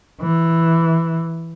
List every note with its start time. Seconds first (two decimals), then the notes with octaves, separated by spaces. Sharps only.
0.21 E3